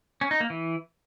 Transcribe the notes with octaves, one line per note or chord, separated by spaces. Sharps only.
C#4
D#4
A#3
E3